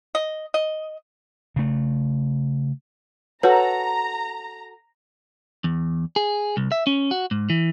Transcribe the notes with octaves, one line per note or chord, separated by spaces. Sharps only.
D#5
D#5
C#3 A3
F#4 A4 B4 C#5 A#5
E2
G#4
C2
E5
C#4
F#4
G#2
E3